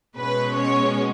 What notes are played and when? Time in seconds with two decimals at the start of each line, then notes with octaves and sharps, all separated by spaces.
0.16 B2 G#3 C#4 B4
0.57 C#5